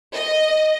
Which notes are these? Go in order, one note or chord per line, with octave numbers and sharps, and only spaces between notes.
D#5